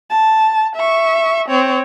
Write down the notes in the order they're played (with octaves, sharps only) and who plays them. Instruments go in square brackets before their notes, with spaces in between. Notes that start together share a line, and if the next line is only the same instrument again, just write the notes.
[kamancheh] A5
E5 C#6
C4 C#5